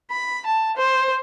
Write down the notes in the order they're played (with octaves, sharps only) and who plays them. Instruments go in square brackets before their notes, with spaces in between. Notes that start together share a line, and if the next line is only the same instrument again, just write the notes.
[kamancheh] B5
A5
C5